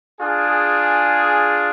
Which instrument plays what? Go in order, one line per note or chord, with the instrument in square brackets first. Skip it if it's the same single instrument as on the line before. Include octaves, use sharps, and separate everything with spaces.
[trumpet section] D4 F4 G#4